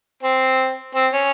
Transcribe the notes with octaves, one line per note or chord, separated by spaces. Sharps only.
C4
C4
C#4